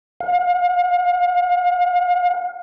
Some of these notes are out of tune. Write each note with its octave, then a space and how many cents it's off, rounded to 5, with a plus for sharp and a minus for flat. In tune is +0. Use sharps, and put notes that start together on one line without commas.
F5 +40